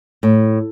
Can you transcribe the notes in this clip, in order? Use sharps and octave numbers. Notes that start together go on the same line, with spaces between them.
A2